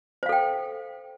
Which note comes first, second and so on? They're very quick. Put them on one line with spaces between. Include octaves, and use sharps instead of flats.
C5 F5 A4 G5